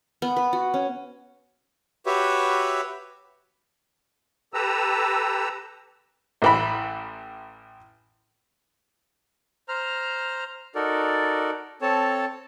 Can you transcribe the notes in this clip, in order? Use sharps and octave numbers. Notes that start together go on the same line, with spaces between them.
B3
B4
F#4
C#4
F#4 G4 B4 C#5 E5
G4 A4 B4 A#5 E6
A1 E3 B5
C5 A#5 F6
D#4 F#4 A4 A#4 D5
C4 A4 C#5 A5